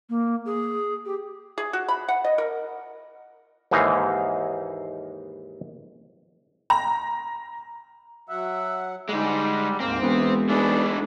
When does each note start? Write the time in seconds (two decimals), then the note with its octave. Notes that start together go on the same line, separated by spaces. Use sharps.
0.10 A#3
0.46 G#4
1.06 G4
1.58 G#4
1.73 F#4
1.89 B5
2.08 F#5
2.24 D#5
2.38 A#4
3.71 D#2 G#2 E3 D#4 F5 A#5
6.70 A#5
8.29 F#3 E5 F#5
9.09 D3 G3 G#3 D#4
9.80 D2 G#2 A#3 C4
10.02 E1 E3 B3
10.49 A3 D4 D#4 G#4 B4